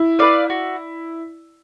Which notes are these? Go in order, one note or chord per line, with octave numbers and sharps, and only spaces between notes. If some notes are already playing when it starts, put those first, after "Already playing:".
Already playing: E4
B4 D5 F5
F#4